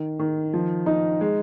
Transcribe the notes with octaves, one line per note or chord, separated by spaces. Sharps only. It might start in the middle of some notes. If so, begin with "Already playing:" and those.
Already playing: D#3
D#3
F3
D#4
G#3